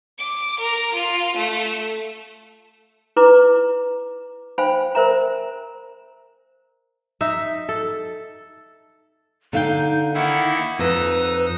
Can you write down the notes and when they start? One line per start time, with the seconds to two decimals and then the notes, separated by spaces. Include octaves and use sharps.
0.18 D6
0.59 A#4
0.93 F4
1.36 A3
3.16 E4 B4 A#5 D6
4.58 C5 F5 G5 G#5 B5
4.95 A#4 C5 E5 A#5
7.21 D#4 E5
7.69 A4
9.53 D3 D#4 F5 G5
10.14 D#3 A#3 E4 F#5
10.79 F2 D#4 B4 E6 A#6